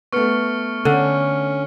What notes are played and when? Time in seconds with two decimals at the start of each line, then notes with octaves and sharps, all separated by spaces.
0.12 A3 B3 C#6 F6 C#7
0.85 D3 C#4